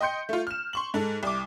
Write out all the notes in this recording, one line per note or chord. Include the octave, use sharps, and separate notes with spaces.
D#5 G5 C6 G6 C#7
A3 F4
F6 E7
C6 C#6 F#7
G#2 A4
C2 D6